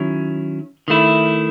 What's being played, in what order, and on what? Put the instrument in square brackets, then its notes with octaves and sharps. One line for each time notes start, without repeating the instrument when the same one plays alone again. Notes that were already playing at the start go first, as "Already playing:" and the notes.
Already playing: [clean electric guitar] D#3 F#3 C#4 E4
D#3 A3 E4